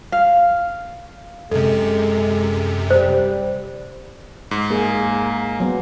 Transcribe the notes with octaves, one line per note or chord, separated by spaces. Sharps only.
F5
F#2 C3 G#3 A4
G3 C5
G#2
A#3 G#4
F#3 B3